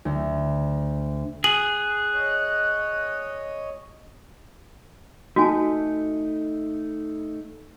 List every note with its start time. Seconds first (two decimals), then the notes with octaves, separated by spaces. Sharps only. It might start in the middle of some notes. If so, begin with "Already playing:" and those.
0.05 D2
1.44 G#4 F#6 F#7
2.14 C#5 D#5
5.36 A3 D#4 F#4 G#5 A5